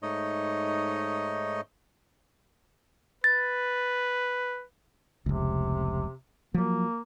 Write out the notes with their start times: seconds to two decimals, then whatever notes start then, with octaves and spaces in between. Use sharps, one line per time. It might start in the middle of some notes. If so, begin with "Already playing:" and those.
0.03 G#2 A3 D#4 C#5 D#5
3.24 B4 A6
5.26 F1 C#2 C3
6.54 F3 F#3 A#3